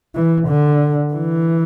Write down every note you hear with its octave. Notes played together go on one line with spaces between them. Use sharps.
E3
D3
E3